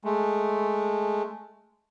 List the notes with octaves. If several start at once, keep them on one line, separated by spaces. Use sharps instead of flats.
G#3 A3